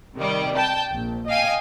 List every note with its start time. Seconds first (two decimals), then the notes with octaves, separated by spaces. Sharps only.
0.16 C3 D#3 G3
0.55 G5 A5
0.92 A#1
1.28 D#5 F5 G5 G#5